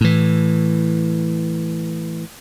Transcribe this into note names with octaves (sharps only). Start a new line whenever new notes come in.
A2 E3